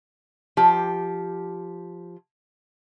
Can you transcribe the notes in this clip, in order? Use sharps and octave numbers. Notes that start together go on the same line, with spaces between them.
F3 G4